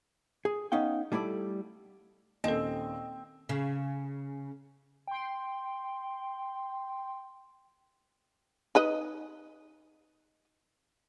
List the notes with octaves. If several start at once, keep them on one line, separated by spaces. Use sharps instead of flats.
G#4
B3 C#4 D#4 F5 G5
G3 A3 E4 A4 D5
D#2 A#2 A#3 C4 C#4 A4 D#5
C#3
G5 C6
D#4 B4 D#5